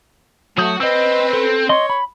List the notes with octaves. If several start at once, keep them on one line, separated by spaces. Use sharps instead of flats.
F#3 A3 F#4 D#6 G6
C4 B4 D#5 E6
A4
C#5 D#5 C6
B5